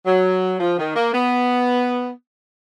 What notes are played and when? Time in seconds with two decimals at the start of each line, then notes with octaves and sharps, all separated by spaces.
0.06 F#3
0.60 F3
0.78 D#3
0.96 A#3
1.14 B3